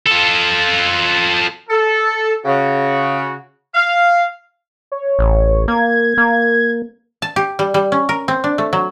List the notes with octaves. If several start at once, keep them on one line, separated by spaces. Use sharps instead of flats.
F4 A4
A4
C#3 F#4
F5
C#5
A1
A#3 G#6
A#3
A5
G4
G3
G3
C#4
A#4
C4
D4
A3
F#3